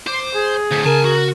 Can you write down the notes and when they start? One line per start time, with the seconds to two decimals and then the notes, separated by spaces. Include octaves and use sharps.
0.07 C5 D6
0.33 G#4
0.71 D2 A2
0.85 C#3 A#4 G#5 A5
1.05 F#4